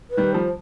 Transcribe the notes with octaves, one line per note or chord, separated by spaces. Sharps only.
B4
D#3 G3
F3 C5